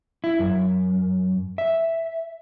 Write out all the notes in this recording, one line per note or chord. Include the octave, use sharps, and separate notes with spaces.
E4
F#2
E5